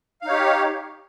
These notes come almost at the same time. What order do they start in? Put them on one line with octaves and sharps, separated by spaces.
F5 D#4 C#5 G4